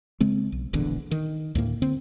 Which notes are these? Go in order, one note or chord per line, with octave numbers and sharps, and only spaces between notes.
C#3 G#3 C4
B1
E1 A#1 E2 D3
D#3
D2 A2 A#3
D3 C4